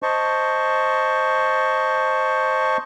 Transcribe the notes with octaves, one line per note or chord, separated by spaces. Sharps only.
C5 D#5 A5 C#6